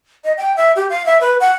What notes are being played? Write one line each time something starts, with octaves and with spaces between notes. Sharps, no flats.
D#5
G5
E5
G4
F5
E5
B4
F#5